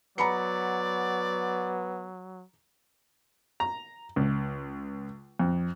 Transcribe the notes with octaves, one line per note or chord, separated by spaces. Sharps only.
F#3 B3 D5 A#5 B5 C#7
A#5
C#2
F2